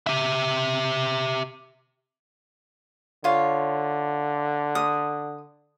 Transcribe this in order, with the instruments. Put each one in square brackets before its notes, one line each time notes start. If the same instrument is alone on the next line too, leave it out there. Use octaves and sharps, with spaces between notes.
[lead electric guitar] G4 E5
[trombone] D3 [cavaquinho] F4 C#5
[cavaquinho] D#6